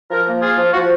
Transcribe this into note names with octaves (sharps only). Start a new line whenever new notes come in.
F3 A#4
A#3
F4 G#4
F3
F3 F#4